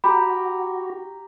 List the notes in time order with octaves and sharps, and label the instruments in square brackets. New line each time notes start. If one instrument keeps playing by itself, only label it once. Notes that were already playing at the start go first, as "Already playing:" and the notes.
[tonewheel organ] F#4 [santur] G4 A#5 [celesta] B5